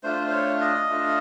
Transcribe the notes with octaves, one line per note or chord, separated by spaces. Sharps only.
A3 D4 F4 C5
C5
C#5
D#5
A3 D4 F4